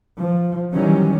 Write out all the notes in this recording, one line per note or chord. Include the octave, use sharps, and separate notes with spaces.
F3
D#3 E3 F#3 G3 C#4